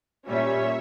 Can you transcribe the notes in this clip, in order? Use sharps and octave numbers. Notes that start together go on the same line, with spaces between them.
A#2 G3 C#4 C#5 E5